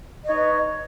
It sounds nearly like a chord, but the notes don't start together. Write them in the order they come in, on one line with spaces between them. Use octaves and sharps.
D#5 C#5 D#4 B4